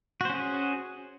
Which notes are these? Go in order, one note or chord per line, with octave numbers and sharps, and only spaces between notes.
C#4 F#4 G#4 C5